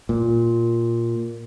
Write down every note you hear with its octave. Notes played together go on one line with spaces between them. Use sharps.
A#2